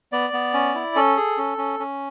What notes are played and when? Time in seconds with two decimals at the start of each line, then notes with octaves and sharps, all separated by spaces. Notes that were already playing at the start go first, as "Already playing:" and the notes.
0.12 B3 D5
0.33 B3
0.54 C#4
0.75 E4
0.95 C#4 A4
1.17 G#4
1.38 C#4
1.58 C#4
1.80 C#4